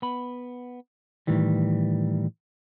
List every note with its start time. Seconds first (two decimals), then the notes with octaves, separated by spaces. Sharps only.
0.02 B3 B5
1.27 A2 D#3 E3 G3